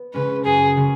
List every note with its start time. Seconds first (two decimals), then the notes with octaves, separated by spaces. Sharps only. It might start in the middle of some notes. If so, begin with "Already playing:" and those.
Already playing: B3
0.14 C#3 G#3 C#4 B4
0.45 F#2 G#4
0.77 C#3 G#3 C#4